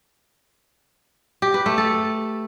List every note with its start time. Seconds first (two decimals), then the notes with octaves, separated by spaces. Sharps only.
1.42 G4
1.54 B4
1.66 A3
1.78 A4